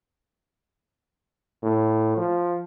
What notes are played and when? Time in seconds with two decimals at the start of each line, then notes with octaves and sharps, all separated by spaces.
1.63 A2
2.17 F3